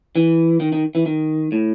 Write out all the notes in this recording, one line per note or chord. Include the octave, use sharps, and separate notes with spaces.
E3
D#3
D#3
E3
D#3
A2